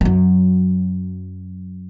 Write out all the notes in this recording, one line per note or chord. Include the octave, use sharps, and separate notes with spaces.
F#2 F#3